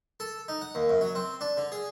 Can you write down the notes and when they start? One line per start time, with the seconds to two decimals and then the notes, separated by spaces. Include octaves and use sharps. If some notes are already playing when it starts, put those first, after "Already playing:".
0.20 A4
0.48 D#4
0.61 F#5
0.75 D#2
0.90 F#2
1.01 F#3
1.15 C4
1.41 D4
1.57 D3
1.72 G#4